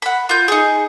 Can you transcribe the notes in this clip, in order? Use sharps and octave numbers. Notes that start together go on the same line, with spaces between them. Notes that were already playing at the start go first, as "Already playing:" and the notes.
F#5 B5
F4 G6
D#4 G#4